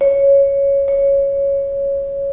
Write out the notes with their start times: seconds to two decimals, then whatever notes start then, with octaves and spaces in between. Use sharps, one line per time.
0.01 C#5
0.88 C#5